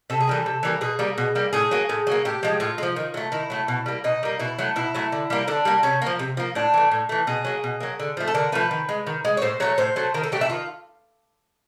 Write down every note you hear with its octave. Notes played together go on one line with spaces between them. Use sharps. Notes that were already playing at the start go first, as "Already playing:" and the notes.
C3 A4
G#4
E3 G3 A#3 A4
C3
E3 G3 A#3
B2 G#4
G3 A#3
B2
G3 A#3
A2 G#4
F#3 A#3
A2
F#3 A#3
A2 G4
F3 G#3
A2 F4
G#3
F3
D#3
F#3 A3
D#3 E4
F#3 A3
B2
G3 A#3
B2 D#4
G3 A#3
B2 E4
F#3 A3
B2 E4
F#3 A3
D3
G3 A#3
D3 D4
G3 A#3
C3 C#4
F3 A#3
C3
F3 A#3
A2 D4
E3 A3
A2
E3 A3
B2 G#4
F#3 A#3
B2
F#3 A#3
D3
F3 A3
A4
D3 A#4
F3 A3 B4
D#3
G#3
D#3
G#3
C#5
A2 C5
F#3 A3 C#5
A2 C5
F#3 A3
D#3 A#4
A4
F#3 A3 G4
E4
D#3 F4